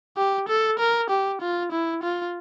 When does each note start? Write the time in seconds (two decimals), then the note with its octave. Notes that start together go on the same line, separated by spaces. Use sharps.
0.17 G4
0.48 A4
0.79 A#4
1.10 G4
1.41 F4
1.72 E4
2.03 F4